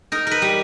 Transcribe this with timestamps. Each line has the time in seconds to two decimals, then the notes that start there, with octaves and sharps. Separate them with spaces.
0.12 D#4 A#4
0.27 A#4 B4
0.42 G3